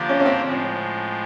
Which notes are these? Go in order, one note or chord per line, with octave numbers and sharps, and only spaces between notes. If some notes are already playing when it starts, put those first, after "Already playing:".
Already playing: D3 F3 A#3 D4 G4
C#4
C#4
C4
A2 F3 G#3